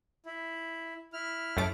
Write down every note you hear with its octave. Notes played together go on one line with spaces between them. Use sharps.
E4
E4 F6
F#2 A3 D6